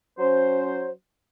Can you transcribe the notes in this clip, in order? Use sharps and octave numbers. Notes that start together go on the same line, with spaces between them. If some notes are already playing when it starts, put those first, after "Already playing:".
F#3 C#4 C5